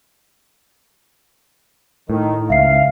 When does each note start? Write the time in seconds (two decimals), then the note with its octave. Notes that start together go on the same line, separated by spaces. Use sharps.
2.10 A2 D#3
2.50 C#2 E5 F5 C7